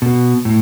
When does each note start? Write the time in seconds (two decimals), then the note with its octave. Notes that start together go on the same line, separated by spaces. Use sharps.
0.02 B2
0.45 A2